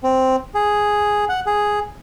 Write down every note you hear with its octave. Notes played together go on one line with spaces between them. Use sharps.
C4
G#4
F#5
G#4